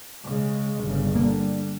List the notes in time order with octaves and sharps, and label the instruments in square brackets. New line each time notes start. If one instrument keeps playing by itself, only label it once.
[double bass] C#3 G#3
G1 C#3
[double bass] D3 G3 [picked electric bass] A#3